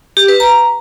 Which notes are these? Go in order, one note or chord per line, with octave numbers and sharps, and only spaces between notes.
G4
B4
A#5